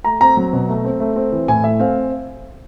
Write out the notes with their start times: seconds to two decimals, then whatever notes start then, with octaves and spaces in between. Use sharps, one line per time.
0.04 A3 A#5
0.21 C4 A#5
0.37 F#3
0.53 B2
0.69 A3
0.85 C4
1.00 A3
1.16 C4
1.32 E3
1.48 A2 G#5
1.64 A3 E5
1.79 C4 F5